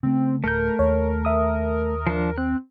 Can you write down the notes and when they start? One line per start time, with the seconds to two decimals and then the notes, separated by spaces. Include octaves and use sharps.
0.03 C#3 A3 C4
0.44 D1 A3 A#4 G6
0.79 D#2 C#5
1.25 E5 D#6
2.07 F3 D4
2.38 C4 F#6